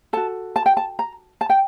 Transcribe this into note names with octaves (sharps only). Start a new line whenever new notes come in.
F#4 A4 A5
A5
G5
A5
A#5
A5
G5